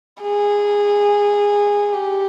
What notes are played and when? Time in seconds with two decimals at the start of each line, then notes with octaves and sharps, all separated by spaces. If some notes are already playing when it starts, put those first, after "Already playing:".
0.22 G#4
1.93 G4